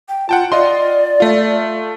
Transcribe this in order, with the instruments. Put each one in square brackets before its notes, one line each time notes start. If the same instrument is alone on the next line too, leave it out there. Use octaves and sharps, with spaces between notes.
[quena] G5
[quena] F4 [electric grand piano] F#5 G5 A5
[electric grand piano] F4 D#5 C6 [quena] D5
[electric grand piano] A3 F4